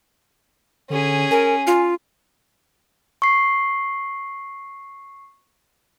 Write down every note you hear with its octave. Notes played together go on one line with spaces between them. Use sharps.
D3 C#4 G#4
A#4 G#5
F4
C#6 C7